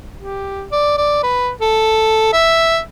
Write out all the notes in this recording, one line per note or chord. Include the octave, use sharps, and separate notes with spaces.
G4
D5
D5
B4
A4
E5